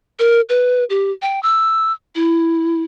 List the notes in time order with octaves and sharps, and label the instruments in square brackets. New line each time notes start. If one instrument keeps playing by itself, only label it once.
[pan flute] A#4
B4
G4
G5
E6
E4